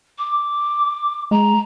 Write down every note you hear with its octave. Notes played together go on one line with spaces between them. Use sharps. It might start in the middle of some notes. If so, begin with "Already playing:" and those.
D6
G#3 A#5